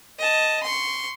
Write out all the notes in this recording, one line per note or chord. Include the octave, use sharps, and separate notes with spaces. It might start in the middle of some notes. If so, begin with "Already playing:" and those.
D#5 A5
C6 C#6